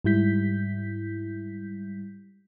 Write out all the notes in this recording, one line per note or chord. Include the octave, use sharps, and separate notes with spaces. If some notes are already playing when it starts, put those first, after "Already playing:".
G#2 G3 E4 G6 B6